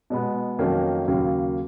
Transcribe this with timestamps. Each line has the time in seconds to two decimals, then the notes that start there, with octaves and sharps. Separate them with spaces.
0.10 B2 G#3 B3
0.59 F2 D#3 F#3 A#3 C#4
1.08 D#2 C#3 F#3 A#3